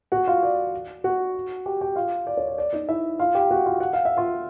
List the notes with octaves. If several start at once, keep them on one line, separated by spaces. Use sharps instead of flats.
F#4 F#5
F4 F5
D5
F#4 F#5
G4 G5
G4 G5
F4 F5
D5
C#5
D5
D5
D#4 D#5
E4 E5
F4 F5
G4 G5
F#4 F#5
F4 F5
F#5
F5
E5
F4 F5